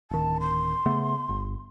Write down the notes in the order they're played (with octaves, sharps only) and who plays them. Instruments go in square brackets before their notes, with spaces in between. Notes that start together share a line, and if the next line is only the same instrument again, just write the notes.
[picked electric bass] D1 D#3 [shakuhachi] A5
[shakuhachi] C6
[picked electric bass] C#3 A3 B3
G1